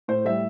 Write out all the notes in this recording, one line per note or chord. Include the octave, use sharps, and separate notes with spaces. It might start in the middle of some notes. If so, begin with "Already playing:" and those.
A2 C5
G3 E5